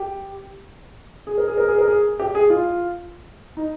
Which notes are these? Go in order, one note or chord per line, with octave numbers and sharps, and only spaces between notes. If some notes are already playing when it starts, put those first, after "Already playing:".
Already playing: G4
G#4
A#4
G#4
A#4
G#4
A#4
G#4
G4
G#4
F4
D#4